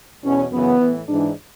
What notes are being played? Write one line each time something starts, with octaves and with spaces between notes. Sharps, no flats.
E2 B2 C#4
F#2 C#3 E3 B3
A2 E3
G#2 E3 D4